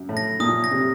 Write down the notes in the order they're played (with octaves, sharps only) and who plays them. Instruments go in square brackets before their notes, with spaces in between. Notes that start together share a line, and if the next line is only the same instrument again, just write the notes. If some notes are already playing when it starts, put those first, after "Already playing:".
Already playing: [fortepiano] F#2
A2
[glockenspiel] A#6
[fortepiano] A#2 [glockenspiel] D#6
[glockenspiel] A#6
[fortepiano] C3